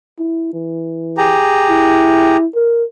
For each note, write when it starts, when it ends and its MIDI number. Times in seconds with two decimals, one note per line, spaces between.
0.19 0.50 64
0.53 1.39 52
1.18 2.37 67
1.18 2.37 68
1.18 2.37 82
1.69 2.46 64
2.55 2.84 70